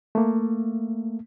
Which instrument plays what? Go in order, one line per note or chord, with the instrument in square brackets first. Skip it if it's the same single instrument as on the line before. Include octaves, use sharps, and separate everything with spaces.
[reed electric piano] A3 A#3